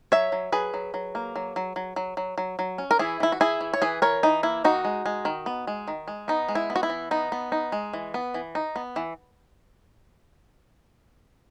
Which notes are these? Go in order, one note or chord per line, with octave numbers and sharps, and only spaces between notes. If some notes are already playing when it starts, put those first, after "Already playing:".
F#3 C#5 E5
F#3
F#3 G#4 B4
F#3
F#3
A#3
F#3
F#3
F#3
F#3
F#3
F#3
F#3
C#4
A#4
E3 E4 G#4
E3 E4
F#4
E3 E4 G#4
E3
C#5
E3 G#4 B4
E3 A#4 C#5
E3 D#4
A#3 E4
D#3 D#4 F#4
G#3
G#3
D#3
B3
G#3
D#3
G#3
B3 D#4
G#3
E4
B3
F#4
E4
E3
B3 D#4
B3
D#4
G#3
E3
B3
E3
D#4
B3
E3